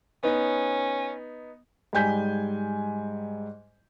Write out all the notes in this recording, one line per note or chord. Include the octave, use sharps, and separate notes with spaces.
B3 C#4 D#4
G#2 G3 G#5 G6 B6